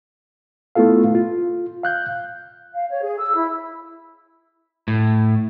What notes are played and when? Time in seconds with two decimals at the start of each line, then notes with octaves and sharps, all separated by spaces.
0.75 A3 B3 E4 F4 A4 F5
1.15 F4
1.83 F5 F#6 G6
2.73 F5
2.89 C#5
3.02 G#4
3.19 E6
3.35 E4
4.88 A2